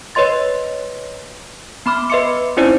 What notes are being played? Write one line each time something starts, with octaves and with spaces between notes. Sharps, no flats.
B4 C#5 D#5 C6 A6
B3 B5 D6 F6
B4 D#5 E5 C6 D6 C#7
C4 C#4 D#4 E4 C5 D5